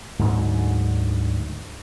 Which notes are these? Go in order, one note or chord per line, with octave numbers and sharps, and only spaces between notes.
D2 G#2 D3 F#3